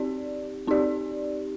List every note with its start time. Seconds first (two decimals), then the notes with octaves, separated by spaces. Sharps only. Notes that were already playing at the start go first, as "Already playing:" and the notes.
Already playing: C4 D#4 G4 D5
0.67 C4 D#4 G4 D5